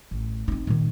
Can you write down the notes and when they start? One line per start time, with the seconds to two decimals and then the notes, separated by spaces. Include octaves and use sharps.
0.11 A1
0.48 C4 D#4
0.67 A#2 D#3